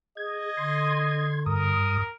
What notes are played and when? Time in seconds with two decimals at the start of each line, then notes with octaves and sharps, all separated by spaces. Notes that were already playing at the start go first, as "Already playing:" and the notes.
0.17 G#4 D#5 G#6
0.57 D3 C6 G#6
1.46 G2 A#4 D#6